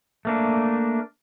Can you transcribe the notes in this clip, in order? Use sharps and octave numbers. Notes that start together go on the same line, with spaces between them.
A3 A#3 D4